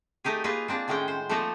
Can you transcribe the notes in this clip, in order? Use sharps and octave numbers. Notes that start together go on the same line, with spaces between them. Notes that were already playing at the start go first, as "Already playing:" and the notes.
A3 D#4 G4 G#4
A#3 D#4 F4 G#4 B4
A#3 C4 D4
A2 D#3 G#3 C#4 G5
C5
F3 A3 A#3 C4 D#4 A4